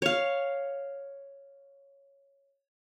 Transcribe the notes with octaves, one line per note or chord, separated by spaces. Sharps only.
C#5 F5